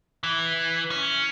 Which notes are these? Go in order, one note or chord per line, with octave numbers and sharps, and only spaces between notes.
E3
C#4